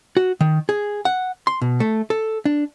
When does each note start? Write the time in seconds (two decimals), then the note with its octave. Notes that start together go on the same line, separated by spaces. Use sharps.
0.17 F#4
0.41 D#3
0.69 G#4
1.05 F#5
1.47 C6
1.61 B2
1.80 A3
2.10 A4
2.45 D4